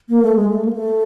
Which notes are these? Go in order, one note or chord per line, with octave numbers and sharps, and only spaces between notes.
A#3
A3
G#3
A3
A#3
A3